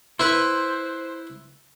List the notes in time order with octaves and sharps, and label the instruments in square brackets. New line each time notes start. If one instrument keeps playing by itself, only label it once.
[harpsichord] E4 B4 [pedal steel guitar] C5